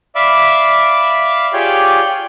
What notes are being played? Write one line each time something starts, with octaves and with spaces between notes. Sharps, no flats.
D5 E5 F5 B5 D6
F4 G4 G#4 C#5 D5 G5